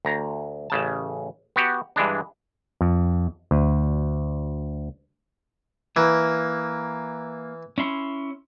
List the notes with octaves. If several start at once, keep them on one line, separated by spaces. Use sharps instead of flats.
D2 A#5
A1 C#3 A5
B3 F#4 G4
G2 E3 G#3 D4
F2
D2
E3 A#3
C#4 E4 C6